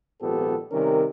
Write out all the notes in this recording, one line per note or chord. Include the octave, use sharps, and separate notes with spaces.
G#1 A#2 F3 B3 G4 A4
C3 D#3 G3 C#4 A#4